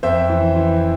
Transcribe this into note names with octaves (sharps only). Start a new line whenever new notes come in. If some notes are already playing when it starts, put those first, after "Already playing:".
F2 C5 E5
E3
E3